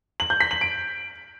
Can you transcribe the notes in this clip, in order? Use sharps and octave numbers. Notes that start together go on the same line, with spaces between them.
F#7
G6
B6
F#7
D7